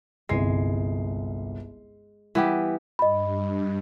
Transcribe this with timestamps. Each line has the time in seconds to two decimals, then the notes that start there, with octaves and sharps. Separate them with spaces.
0.29 G1 C2 G#3 C7
2.35 E3 G3 B3 G4
2.99 G2 D#5 B5